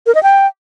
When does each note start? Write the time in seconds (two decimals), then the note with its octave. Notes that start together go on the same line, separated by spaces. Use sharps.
0.07 A#4
0.15 D#5
0.23 G5